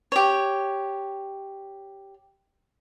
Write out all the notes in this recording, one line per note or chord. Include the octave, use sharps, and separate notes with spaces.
G4 C#5